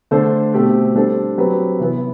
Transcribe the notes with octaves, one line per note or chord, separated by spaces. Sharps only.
D3 A3 D4 A4 C5
B2 A3 C4 G4
G3 D4 A4 C5
F#3 C4 G4 B4
C3 E3 B3